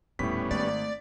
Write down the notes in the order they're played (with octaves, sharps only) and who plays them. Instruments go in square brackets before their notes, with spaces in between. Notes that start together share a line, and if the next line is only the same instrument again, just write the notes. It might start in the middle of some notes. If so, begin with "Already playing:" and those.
[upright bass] D#1 [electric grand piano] A2 B6 [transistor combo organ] G3 B3 C#4
[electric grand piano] G#1 [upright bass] A3 [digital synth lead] D5